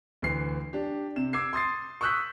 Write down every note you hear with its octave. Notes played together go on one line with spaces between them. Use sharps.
D2 E3 C7
D4 G4
C3 E7
D6 E6 G#6 C7
C6 D#6 A6 C7
C#6 D#6 E6 F#6 G6 B6